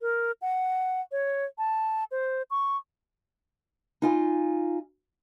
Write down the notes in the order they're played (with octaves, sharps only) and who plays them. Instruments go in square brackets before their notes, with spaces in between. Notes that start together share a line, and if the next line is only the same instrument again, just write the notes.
[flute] A#4
F#5
C#5
A5
C5
C#6
[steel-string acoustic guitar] D#4 F4 G#5